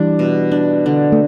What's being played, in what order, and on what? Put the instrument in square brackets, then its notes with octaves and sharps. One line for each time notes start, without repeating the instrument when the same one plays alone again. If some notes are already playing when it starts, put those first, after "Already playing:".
Already playing: [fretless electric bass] E3 G3 [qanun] D4
[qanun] B2
D4
D3
[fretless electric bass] A3